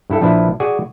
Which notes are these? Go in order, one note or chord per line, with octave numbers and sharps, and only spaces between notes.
G2 E4 A4
A#1 F3 D4 E4 B4 E5
F#4 G#4 D5 G#5